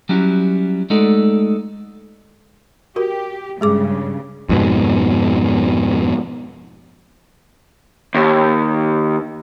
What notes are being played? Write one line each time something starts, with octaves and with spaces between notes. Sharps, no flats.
F#3 G3 C#4 E4 F#4
G#3 A3 D#4 F#4 A4 D5
F#4 G4 A#4
G2 C#3 G#3 G#4 D6
F2 G#2 B2
D#2